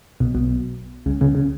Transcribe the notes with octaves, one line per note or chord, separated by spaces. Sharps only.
B1 B2
B1 B2
C#2 C#3
C#2 C#3
C#3